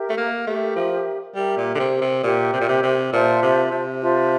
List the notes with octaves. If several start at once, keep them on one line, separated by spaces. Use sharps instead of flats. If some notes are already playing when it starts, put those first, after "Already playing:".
Already playing: G4 A#4 E5
A3
A#3
A3 G4 A#4 E5
F3
G3 G4 A#4 E5
A#2
D3
C3
C3
A#2 G4 A#4 E5
C3
A#2
C3
C3
A#2 F4 C5 E5 A5
C3
C3
F4 C5 E5 A5